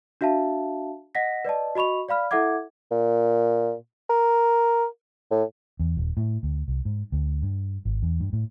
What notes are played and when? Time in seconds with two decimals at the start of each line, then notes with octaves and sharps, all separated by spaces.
0.21 D4 F#4 E5 F5 A5
1.15 D#5 F#5 A#6 B6
1.45 B4 D5 D#5 A5
1.76 F#4 D#5 B5 C#6 F7
2.09 D5 F5 B5 F6
2.31 E4 A4 E5 F#5 D6 G#6
2.91 A#2
4.10 A#4
5.31 A2
5.79 E2
5.97 D#1
6.17 A2
6.43 D2
6.68 C2
6.85 G#2
7.12 D2
7.42 G2
7.85 G#1
8.03 E2
8.20 G2
8.33 A2